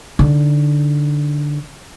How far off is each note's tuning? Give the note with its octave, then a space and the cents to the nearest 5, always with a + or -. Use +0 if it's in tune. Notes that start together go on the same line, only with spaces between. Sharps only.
D3 +0 D#4 +0